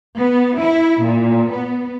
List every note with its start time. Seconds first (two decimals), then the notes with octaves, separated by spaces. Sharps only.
0.17 B3
0.59 E4
1.04 A#2
1.53 B3